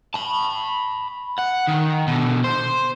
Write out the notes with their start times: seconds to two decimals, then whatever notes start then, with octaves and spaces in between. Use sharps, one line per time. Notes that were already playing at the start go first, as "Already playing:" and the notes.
0.14 A5 B5
1.39 F#5
1.68 D#3
2.07 B2 D3
2.44 C5